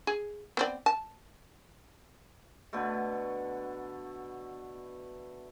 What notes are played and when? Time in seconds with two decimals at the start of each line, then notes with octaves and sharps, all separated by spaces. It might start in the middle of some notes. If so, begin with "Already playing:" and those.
0.07 G#4
0.57 B3 C4 D5
0.86 A5
2.73 B2 D3 A3